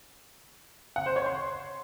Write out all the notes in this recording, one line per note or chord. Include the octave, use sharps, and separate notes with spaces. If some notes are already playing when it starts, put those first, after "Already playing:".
F#5
C5
C#5
C6